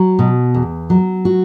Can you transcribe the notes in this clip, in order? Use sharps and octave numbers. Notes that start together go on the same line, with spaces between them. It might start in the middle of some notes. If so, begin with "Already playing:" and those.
Already playing: F#3
B2
E2
F#3
F#4